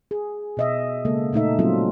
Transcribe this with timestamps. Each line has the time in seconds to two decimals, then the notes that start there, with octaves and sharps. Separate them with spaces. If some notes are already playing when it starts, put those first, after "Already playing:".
0.11 G#4
0.57 B2 D#5 E5
1.05 C#3 G#3 A#3 A4
1.33 A#2 A3 D#4 E5
1.59 F#3 G3 C4 C#4 F4 A4